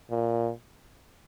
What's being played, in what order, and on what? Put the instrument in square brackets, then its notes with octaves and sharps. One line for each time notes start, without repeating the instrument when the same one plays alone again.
[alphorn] A#2